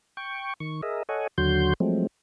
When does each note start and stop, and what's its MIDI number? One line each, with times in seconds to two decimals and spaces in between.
0.17 0.54 79
0.17 0.54 85
0.60 0.81 51
0.60 0.81 85
0.82 1.03 68
0.82 1.03 70
0.82 1.03 75
0.82 1.03 76
1.09 1.27 69
1.09 1.27 73
1.09 1.27 75
1.09 1.27 78
1.09 1.27 80
1.38 1.73 39
1.38 1.73 50
1.38 1.73 54
1.38 1.73 66
1.38 1.73 84
1.38 1.73 91
1.80 2.07 53
1.80 2.07 54
1.80 2.07 56
1.80 2.07 57
1.80 2.07 60